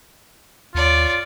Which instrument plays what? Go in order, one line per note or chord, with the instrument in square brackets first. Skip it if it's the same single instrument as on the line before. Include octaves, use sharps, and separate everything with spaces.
[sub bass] D#2 [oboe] F4 [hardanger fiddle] C#5 D5